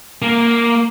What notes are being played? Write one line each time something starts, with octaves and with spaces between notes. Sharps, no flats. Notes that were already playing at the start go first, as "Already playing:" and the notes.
A#3